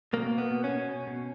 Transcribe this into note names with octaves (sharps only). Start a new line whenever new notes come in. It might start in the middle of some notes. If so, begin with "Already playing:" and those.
B2 A#3
B2
B3
B2
C#4
B2
B2
B2